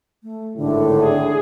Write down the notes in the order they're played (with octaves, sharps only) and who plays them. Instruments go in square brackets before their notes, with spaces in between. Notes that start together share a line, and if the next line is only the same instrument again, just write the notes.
[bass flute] A3
[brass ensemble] G#1 A2 [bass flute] D3
[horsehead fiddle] G#4